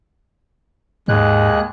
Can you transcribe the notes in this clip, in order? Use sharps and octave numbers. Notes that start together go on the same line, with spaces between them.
D#2 G#2 G#3 F#6